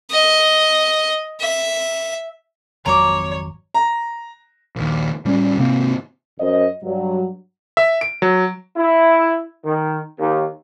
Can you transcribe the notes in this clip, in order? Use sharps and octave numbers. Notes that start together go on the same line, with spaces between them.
D#5
E5
G#1 F2 F#3 C#5 A#5 D6
A#5
A#1 D#2
A2 G3 C#4
G#2 C3 A#3 C4
F#2 C5 D#5
G2 F#3
E5
D7
F#3
E4
D#3
D#2